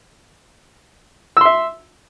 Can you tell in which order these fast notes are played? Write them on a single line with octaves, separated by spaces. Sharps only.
E6 C6 E5